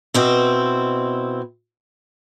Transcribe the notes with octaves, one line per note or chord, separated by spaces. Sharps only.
B2 C4 E4